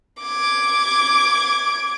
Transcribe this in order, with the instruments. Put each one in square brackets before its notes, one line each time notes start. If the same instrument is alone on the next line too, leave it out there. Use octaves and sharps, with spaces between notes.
[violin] D6 G#6